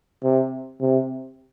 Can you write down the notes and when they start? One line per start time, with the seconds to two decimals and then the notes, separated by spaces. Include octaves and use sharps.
0.23 C3
0.81 C3